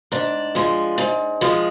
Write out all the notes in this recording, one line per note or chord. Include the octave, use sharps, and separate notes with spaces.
G#2 D4
F3 G#3
G#2
F3 G#3